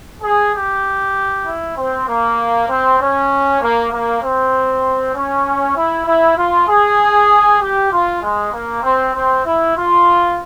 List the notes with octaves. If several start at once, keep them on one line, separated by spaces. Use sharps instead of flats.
G#4
G4
E4
C4
A#3
C4
C#4
A#3
A#3
C4
C#4
E4
E4
F4
G#4
G4
F4
G#3
A#3
C4
C4
E4
F4